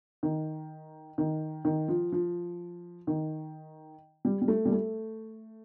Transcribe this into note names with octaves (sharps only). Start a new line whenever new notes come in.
D#3
D#3
D#3
F3
F3
D#3
G3
G3
A3
G3
A3